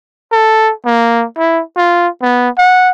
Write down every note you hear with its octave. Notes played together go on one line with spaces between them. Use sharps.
A4
A#3
E4
F4
B3
F#5